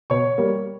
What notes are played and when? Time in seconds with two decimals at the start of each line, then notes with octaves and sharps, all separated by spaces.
0.10 B2 C#5 C#6
0.38 G3 A#3